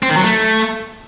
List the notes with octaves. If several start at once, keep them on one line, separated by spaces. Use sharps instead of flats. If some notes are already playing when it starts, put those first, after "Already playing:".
C4
D#3
F#3
A3